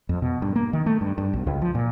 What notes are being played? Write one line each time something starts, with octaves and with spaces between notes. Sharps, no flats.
F2
B2
G2
A#3
D#3
A3
G2
G2
B1
C#2
F3
A#2